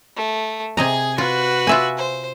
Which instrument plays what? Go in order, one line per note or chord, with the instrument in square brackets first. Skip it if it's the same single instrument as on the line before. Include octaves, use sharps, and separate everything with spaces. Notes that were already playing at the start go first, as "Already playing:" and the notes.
[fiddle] A3
[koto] C3 D#5 A#5 [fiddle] G#4 G#5
[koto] F4 [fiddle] F#4 B4
[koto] F4 E5 G#5
[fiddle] C5